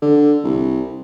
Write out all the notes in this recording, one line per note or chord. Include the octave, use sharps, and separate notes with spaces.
D3
C2